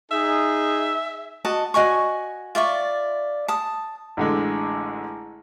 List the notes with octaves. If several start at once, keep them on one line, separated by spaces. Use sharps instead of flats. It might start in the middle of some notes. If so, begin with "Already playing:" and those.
D#4 G#4 E5
F#4 D#5 A5
F#4 D#5 G#5 C#6
F4 D5 E5 C#6
A5 D#6
A1 D3 G#3